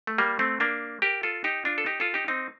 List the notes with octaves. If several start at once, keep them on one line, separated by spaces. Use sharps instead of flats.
A3
G3 A#3
A3 C4
A#3 D4
G4 A#4
F4 A4
D#4 G4
D4 F4
A4
D#4 G4
F4 A4
D#4 G4
C4 D#4